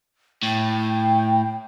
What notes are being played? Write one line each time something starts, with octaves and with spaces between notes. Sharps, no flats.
A2 G5